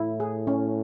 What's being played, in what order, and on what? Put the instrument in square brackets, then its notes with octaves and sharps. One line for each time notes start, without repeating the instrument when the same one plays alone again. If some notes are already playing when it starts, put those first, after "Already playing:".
Already playing: [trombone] A2 [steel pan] E4
[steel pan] G#4
C#4